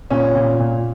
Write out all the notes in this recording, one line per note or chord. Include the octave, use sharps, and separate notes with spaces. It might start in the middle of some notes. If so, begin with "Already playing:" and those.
A#2 C#4
A#2
A#2